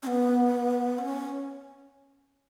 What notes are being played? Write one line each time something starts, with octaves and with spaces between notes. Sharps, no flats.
C#4
B3
C#4